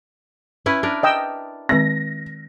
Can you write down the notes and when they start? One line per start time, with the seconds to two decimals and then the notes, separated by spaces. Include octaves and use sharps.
0.66 C#4 E4 B4
0.83 D4 A#4 B4
1.03 D#5 G5 E6
1.69 D#3 G#3 C4 A#6